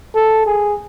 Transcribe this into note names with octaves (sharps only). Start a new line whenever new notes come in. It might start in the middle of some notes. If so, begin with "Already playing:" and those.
A4
G#4